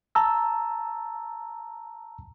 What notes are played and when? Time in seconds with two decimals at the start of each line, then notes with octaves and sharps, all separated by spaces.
0.15 A5 A#5 E6